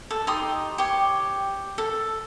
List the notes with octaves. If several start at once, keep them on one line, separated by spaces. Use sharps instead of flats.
A4
D#4 G4 C6 D#6
G4 C#5
A4